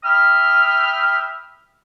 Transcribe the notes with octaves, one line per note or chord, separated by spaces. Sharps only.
E5 G5 B5 D#6 F6